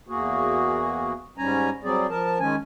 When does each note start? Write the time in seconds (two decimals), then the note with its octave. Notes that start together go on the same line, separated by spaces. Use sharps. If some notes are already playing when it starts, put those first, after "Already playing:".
0.08 E2 A#3 F#4 G#4
1.38 G#2 G3 C#4 G#5 A#5
1.84 F#3 G3 C4 G#4 D5
2.10 F3 A#4 A5
2.40 D#3 G#3 C#4 G#5